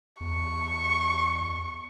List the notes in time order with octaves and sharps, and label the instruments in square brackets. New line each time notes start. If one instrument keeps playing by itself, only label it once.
[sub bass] E2 [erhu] C#6